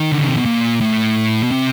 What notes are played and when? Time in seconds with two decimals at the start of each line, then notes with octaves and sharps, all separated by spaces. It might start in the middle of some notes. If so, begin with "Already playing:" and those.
Already playing: D#3
0.12 D3
0.21 C#3
0.28 C3
0.36 B2
0.45 A#2
0.81 A2
1.43 B2
1.51 C3